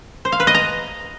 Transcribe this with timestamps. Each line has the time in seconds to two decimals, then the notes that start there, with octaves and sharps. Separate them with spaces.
0.25 C5
0.32 F5
0.40 B4
0.47 D#5
0.55 A#5